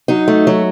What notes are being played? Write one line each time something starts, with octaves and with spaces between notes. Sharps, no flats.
F#3 D#4
A3
F#3